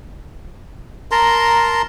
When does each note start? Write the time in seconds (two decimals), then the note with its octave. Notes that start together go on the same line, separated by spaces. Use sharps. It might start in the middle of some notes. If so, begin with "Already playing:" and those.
1.11 A#4 A5 A#5 C6